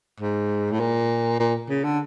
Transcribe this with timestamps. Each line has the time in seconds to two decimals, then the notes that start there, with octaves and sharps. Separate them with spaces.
0.20 G#2
0.72 A2
0.80 A#2
1.40 A#2
1.69 C#3
1.84 D3